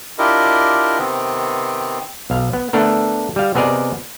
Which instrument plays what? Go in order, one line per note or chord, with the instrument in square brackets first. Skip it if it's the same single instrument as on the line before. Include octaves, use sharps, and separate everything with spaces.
[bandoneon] D4 E4 F4 G4 A#4 D#5
C3 D#3 B3 C4
[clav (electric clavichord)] B1 F5
B3
A3 B3 D4 A4 A#4
G3 F5
C3 B3 G#4 A#4 D5 D#5